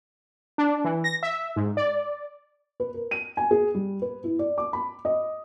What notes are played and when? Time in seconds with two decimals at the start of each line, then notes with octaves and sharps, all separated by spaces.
0.58 D4
0.85 E3
1.04 A#6
1.23 E5
1.56 G#2
1.77 D5
2.80 B4
2.94 A#4
3.11 D#7
3.37 G#5
3.51 G#4
3.74 G3
4.02 B4
4.24 E4
4.39 D5
4.58 D6
4.73 B5
5.05 D#5